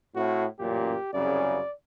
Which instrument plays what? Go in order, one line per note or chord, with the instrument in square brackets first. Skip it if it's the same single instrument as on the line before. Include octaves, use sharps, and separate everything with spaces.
[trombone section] A2 C4 [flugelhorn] F#4
[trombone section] A1 F#2 A#2 [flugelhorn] G4
[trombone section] C2 F#2 C#3 [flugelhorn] D5